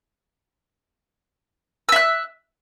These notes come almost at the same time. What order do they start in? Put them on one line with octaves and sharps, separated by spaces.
E6 E5 F#6